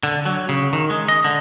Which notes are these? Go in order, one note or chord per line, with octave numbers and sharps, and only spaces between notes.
D3
F#3
C#3
D#3
G#3
D#5
D3